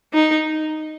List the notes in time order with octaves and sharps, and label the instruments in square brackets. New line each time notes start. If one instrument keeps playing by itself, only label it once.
[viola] D#4